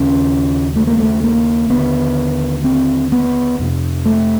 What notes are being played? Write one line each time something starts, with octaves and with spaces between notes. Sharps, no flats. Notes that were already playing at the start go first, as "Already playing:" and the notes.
Already playing: D#2 C#3 C#4
A3
A#3
A3
A#3
D#2 D3 B3
C4
B3
F2 C3
A3